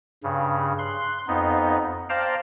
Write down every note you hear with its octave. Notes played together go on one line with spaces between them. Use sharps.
G2 C#3
C6 F#6
F2 B3 D#4
C5 D5 F5 G5 A5 A#5